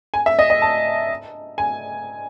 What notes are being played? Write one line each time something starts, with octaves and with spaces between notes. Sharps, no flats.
G#5
E5
D#5
D#5
A5
G#5